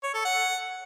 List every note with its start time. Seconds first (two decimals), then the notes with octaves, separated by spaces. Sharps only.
0.03 C#5
0.14 A4
0.25 F#5